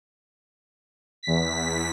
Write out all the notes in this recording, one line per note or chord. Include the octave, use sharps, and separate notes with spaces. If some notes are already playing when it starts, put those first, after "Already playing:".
E2 B6